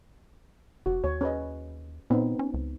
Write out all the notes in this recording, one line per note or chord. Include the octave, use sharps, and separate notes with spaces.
F1 F#4
D#2 C#5
C#4 B4 D#5
A#2 B3 C4 D#4
C#4
C#2